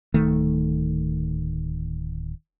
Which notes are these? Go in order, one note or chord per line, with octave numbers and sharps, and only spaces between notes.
D1 D#3 A3